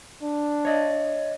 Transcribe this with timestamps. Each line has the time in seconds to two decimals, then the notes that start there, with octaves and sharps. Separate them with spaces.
0.23 D4
0.65 C#5 D#5